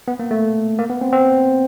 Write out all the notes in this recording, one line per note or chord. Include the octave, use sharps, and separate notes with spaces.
B3
A#3
A3
A#3
B3
C4
C4